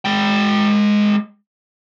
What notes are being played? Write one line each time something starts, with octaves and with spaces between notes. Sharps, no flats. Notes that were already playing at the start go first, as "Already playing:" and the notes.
G#3 G5